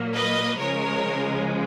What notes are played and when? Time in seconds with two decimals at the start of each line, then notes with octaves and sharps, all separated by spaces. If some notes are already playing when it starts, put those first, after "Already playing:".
Already playing: A#2 F#3 A#3
0.14 B4 D#5
0.58 C#3 F3 G#3 A#4 C#5